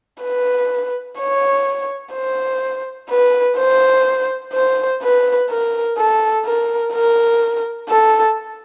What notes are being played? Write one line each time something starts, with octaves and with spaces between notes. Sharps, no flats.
B4
C#5
C5
B4
C5
C5
B4
A#4
A4
A#4
A#4
A4